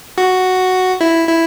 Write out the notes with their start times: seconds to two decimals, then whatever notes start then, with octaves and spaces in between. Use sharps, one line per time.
0.18 F#4
1.01 E4
1.28 E4